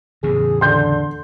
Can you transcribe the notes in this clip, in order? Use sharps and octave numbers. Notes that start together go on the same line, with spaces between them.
E2 A2 C#3 G#4
D3 C6 G6